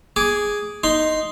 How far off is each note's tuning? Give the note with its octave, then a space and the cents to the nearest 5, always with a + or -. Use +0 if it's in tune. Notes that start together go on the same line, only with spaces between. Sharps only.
G#4 +0 D6 -10
D#4 +0 C6 +0